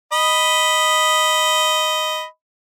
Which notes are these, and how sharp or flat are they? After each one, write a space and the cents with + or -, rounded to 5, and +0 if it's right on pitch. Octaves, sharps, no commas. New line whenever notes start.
D#5 +0 B5 +0